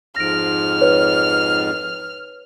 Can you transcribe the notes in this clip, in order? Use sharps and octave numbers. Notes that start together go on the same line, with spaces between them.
F2 G#2 F6 A#6 D7
B4 C#5